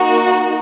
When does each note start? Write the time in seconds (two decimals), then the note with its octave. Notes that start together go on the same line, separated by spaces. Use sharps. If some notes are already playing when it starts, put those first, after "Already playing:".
Already playing: A#3 D#4 F#4